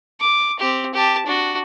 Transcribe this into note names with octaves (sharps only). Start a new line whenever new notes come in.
D6
C4 G4
G4 A5
D4 F#4